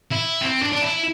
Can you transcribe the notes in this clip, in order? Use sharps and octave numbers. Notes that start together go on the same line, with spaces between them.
E4
C4
D4
D4
E4